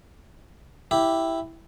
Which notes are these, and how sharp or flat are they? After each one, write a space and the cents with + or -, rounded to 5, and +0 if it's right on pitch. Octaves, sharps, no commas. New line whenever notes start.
E4 +0 G4 +0